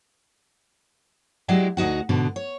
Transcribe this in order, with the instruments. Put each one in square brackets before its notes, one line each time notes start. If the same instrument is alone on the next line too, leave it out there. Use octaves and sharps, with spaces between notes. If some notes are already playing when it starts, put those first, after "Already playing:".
[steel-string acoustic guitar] F#3 G#3 E4 G4 D5
D2 D#4 F#4 F#5
G#2 B2 D3
C#5